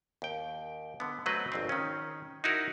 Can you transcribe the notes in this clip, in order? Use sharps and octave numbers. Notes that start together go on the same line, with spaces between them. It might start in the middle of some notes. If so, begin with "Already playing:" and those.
D#2 G5
D3 B3
F#3 A3 C4 B4 D#5
G#1 F2 C4
D#3 C#4
D#4 E4 F#4 A#4